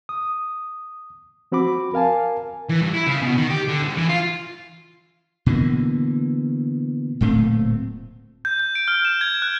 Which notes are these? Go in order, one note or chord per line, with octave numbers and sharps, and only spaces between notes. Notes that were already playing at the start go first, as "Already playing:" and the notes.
D#6
F3 C4 F#4 B5 D6
A#4 F5 G#5 A5
E3
G2
E4
C#3
B2
D#3
G4
D3
C2
E3
F4
B2 D3 E3 A#3
D1 A#2 A3 C4
G6
G6
D7
F6
E7
G#6
F#6